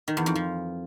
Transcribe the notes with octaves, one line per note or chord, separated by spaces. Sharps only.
D#3
E2
F2
F3